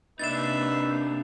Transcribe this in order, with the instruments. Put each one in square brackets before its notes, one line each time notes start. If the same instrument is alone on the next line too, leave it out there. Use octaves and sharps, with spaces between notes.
[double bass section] C3 A#3 [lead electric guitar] D4 D#4 [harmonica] B4 E5 [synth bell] A6 E7